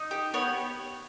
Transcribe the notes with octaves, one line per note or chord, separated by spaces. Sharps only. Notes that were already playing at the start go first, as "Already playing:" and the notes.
Already playing: D#4
G4
B3 C#5